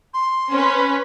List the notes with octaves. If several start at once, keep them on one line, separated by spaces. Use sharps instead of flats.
C6
C#4 B4